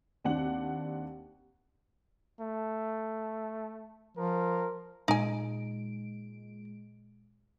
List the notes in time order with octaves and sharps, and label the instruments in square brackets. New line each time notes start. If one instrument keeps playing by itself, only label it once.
[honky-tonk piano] D#2 C4 D4 F#5 F#7
[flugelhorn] A3
[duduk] F3 [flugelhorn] A#4
[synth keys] A#2 G#3 D7 [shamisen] D#4 G#5